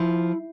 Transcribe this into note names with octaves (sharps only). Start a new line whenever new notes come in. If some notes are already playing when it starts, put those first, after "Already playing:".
Already playing: F3 E4